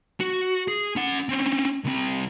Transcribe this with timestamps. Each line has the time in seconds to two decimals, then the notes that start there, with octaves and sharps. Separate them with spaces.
0.20 F#4
0.68 G#4
0.96 C#4 F#5
1.29 C4 C#4
1.84 C2 C4